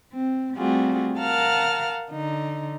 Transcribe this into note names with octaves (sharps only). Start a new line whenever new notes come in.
C4
G3 A3 C4 F4 F#4 G#4
A#4 F5 F#5 A5 A#5 F6
D3 D#4